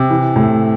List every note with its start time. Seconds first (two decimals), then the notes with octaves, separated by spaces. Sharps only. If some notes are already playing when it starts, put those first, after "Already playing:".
Already playing: C3
0.10 E3
0.36 A2